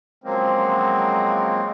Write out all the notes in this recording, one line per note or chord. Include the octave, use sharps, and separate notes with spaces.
C#3 F3 F#3 G#3 A#3 C4